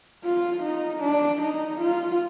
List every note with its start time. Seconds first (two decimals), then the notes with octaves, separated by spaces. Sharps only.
0.24 F4
0.63 D#4
1.03 D4
1.42 D#4
1.81 F4